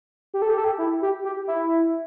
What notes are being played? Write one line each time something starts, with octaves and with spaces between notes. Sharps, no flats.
G4
A4
G4
A4
G4
E4
G4
G4
E4